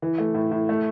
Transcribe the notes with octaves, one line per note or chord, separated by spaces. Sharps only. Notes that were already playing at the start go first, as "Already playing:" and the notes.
E3
A3
A2
A2
A3